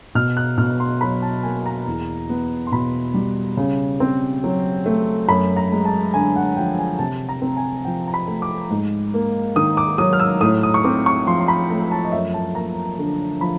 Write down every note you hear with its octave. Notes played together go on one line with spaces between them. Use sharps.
B2 F6
F#6
B2 F6
C6
F#3 B5
A5
A#3 G#5
A#5
E2
B3
C6
B2 B5
G3
C#3
C4
F#3
A3
F#2 B5
A#5
G#3
A5
D3 G#5
F#5
F3 G5
G#5
C3 A5
A#5
C4
G#5
F3 G5
A#5
B5
A3
D6
G#2
A#3
D#3 D#6
D6
F#3 D#6
F6
E6
A2 D#6
D#6
C#6
C4 D6
C#6
F3 C6
C6
B5
A3 A#5
A5
D#5
F#2 E5
A5
A#3 A#5
D3
F3 B5